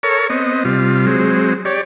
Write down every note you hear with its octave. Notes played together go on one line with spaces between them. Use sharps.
A4 A#4 C#5 C#6
B3 C4 D#5
C3 G3 F4
F#3 G#3 C4
G4 C#5 D5